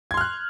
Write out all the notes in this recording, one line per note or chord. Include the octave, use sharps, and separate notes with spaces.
C6 F6 F#6 G#6